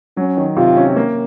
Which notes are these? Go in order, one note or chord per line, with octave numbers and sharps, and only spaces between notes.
F#3 C#4
D#3
C3 F4
C#4
A#3